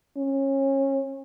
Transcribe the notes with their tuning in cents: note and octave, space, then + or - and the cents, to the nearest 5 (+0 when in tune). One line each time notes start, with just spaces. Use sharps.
C#4 -25